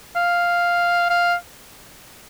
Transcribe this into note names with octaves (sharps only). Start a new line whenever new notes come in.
F5
F5